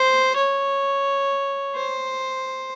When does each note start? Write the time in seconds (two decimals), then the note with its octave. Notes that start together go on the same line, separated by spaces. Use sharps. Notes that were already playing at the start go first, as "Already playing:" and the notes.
Already playing: C5
0.36 C#5
1.75 C5